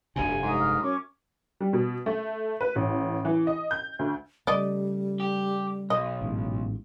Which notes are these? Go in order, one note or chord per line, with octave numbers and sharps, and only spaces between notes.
F1 D2 G2 C3 G#5
G#2 A#5 D#6
F6
F#2 C#4 C#6 D6
G3
B2
A3
B4
A1
E3
D#5
G6
D2
C#3 G3 A3 D5 D#5
G4
B1 D#5
A1 G#2